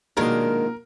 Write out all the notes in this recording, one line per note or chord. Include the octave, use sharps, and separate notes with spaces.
A#1 B2 D#3 G#3 D4 A#4 C6